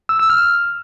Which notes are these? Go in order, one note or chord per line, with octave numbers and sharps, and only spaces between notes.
E6
E6
F6